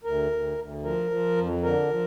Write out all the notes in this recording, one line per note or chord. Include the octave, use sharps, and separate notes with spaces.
D2 A#4
D2
D2
F3 A#4
F3
F2
D3 A#4
F3